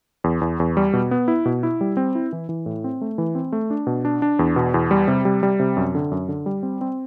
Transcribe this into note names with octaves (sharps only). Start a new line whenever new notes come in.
E2
E2
E2
G3
B2
B3
E4
B2
E4
G3
C4
E4
E3
E3
A2
C4
A3
E3
C4
A3
D4
B2
D4
D4
E2
B2
E2
G3
C3
G3
G3
C3
F#2
D3
F#2
D3
G3
C4
C4